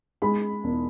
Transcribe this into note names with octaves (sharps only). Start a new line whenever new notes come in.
G#3 B5
E1